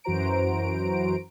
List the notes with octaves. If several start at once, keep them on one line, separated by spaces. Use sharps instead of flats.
F#2 E3 F#4 C5 A#5 D7